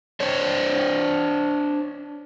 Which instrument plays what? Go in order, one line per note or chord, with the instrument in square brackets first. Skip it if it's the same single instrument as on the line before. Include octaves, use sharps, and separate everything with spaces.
[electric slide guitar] D4 C5 C#5